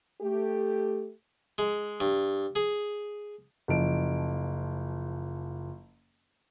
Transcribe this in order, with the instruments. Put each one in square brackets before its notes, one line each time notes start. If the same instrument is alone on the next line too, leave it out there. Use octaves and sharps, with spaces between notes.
[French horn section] A3 G4
[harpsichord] G#3
G2
G#4
[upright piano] F#1 F3 D7